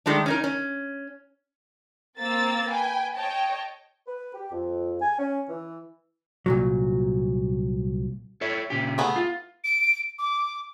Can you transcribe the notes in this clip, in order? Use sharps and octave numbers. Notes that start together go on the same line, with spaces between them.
D#3 G#3 A3 D4
C#4 D#4 A#4
C#4
A#3 C4 E6 A6
B4 G5 G#5
C#5 D#5 G5 A5
B4
G4
F2
G#5
C#4
E3
C2 A#2 F#3
A4 C#5 E5
A#2 C#3 G4
A3 B3 G#4
F4
D7
D6